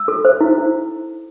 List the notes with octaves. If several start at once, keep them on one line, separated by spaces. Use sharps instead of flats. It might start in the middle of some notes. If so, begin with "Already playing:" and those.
Already playing: E6
A4
C5
E4
E4